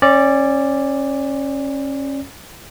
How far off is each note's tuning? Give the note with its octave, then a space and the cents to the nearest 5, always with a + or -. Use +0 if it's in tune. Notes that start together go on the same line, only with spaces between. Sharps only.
C#4 -25 D5 +0